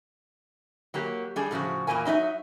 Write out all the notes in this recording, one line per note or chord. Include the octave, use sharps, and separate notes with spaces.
F#3 A#3 G4
G3 D4 G#4
A2 C#3 F3 F#4
E2 A#2 E3 A#3 G#5
F#3 D#4 D#5 E5